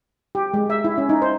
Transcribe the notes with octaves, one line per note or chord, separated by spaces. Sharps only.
G4
G#3
E5
E4
C#4
D#4
C5